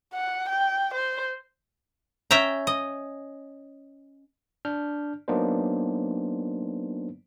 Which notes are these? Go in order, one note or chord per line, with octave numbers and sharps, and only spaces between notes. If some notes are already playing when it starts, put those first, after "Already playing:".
F#5
G5
C5
C#4 E5 G5 A#5
D#5
D4 F6 G6
F#3 A#3 B3 D4 D#4 C5